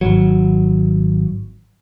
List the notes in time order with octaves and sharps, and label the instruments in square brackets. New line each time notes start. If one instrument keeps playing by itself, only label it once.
[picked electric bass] G#1 C#2 F#3